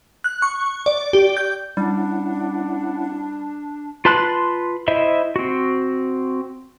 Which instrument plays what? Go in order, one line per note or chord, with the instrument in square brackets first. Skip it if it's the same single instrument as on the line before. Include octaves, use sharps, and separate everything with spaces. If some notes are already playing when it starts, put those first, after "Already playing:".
[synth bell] F#6
C#6
D5
G4
G6
[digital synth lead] G3 [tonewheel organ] C#4 E4 F#5 [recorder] D4
[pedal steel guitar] F4 B4 A5 C6 F#6
E4 C5 D#5 E5
C4 F#4